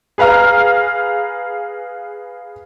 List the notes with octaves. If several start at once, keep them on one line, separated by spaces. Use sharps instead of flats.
G#4 B4 F5 A#5 F6